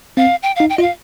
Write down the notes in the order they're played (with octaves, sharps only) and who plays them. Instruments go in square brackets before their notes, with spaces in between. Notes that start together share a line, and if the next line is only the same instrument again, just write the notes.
[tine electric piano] C4 [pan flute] F5
[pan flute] G5
F5
[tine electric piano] D#4
[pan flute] G5
[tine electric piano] F4 [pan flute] D#5
[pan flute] F5